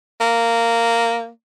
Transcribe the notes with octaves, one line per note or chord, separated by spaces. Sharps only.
A#3